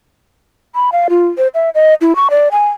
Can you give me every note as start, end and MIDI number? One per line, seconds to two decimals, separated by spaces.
0.75 0.90 83
0.92 1.08 77
1.10 1.27 65
1.38 1.48 72
1.54 1.70 76
1.75 1.94 75
2.01 2.16 64
2.16 2.28 85
2.30 2.48 74
2.51 2.67 80